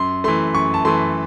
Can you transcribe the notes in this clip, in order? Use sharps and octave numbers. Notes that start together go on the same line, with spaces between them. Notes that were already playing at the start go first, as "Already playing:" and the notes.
Already playing: F#2 C6
E3 A3 C6
F#2 C#6
A5
E3 A3 C6